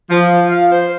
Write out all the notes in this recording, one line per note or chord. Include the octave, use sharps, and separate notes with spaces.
F3
F5
C5